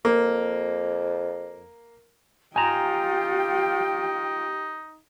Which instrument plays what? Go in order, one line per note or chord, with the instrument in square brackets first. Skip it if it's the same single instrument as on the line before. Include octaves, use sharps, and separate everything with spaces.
[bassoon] F2 [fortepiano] A#3
[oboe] D#4 [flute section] F4 G5 [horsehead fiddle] G4 [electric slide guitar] G#5 A#5